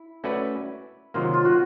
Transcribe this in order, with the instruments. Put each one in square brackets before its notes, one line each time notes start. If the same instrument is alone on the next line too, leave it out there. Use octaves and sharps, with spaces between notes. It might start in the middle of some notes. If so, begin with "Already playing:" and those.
Already playing: [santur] E4
[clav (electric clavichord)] A3 C#4 F#4 B4 D5
[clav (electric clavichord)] C3 D#3 F#3 A#3 [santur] F4
[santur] F4
F#4